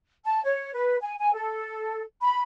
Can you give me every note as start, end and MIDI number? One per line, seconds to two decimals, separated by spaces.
0.25 0.39 81
0.44 0.71 73
0.73 0.96 71
1.01 1.14 80
1.19 1.33 80
1.34 2.02 69
2.21 2.41 83